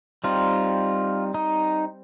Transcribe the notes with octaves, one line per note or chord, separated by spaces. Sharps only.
G3 C4 D#4 F4
D#4